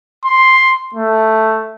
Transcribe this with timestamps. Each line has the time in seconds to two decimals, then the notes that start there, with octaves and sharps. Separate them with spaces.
0.24 C6
0.94 A3